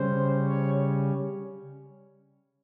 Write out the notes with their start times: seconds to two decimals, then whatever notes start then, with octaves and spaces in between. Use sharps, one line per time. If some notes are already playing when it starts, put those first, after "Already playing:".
Already playing: C#3 G3 C#4 C5
0.47 C#5